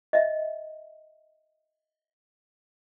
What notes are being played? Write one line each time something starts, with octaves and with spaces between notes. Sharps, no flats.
D#5 E5